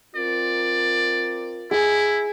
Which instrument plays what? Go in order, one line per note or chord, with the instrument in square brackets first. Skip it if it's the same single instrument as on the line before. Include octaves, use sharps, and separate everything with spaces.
[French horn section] C4 F4 A#4 [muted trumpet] D5
[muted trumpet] E4 [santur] G#4